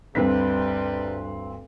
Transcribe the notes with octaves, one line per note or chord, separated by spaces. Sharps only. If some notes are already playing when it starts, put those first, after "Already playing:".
D2 G2 C3 G3 C4 A4 B4 B6